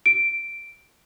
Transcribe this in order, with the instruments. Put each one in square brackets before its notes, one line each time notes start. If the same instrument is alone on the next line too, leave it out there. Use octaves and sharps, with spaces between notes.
[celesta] D7